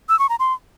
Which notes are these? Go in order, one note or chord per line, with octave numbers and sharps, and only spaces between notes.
E6
C#6
A#5
C6